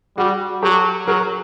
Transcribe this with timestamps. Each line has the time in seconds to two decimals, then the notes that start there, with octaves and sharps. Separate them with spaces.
0.17 G3 F#4 G#4
0.62 F#3 G4 A4
1.07 F#3 G#4 A#4